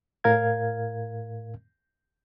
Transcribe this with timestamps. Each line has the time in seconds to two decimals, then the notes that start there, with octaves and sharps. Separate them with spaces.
0.24 A2 A#4 F5 G#6